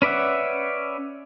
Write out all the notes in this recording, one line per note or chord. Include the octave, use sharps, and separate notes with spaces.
C#4 B4 D5 E5 F#5